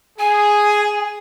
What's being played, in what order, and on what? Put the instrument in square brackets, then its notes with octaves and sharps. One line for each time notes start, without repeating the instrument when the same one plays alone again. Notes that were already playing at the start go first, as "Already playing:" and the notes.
[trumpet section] G#4 [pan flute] G#5